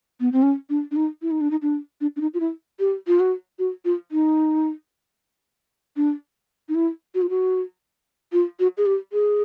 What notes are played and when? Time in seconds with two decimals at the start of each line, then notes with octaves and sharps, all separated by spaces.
0.20 B3
0.32 C4
0.42 C#4
0.70 D4
0.91 D4
0.96 D#4
1.22 E4
1.31 D#4
1.41 D4
1.51 D#4
1.62 D4
2.01 D4
2.16 D4
2.21 D#4
2.34 F4
2.40 E4
2.79 G4
3.07 F4
3.20 F#4
3.59 F#4
3.85 F4
4.12 D#4
5.96 D4
6.69 D#4
6.75 E4
7.15 F#4
7.22 F4
7.30 F#4
8.32 F4
8.60 F#4
8.77 G#4
8.86 G4
9.13 G#4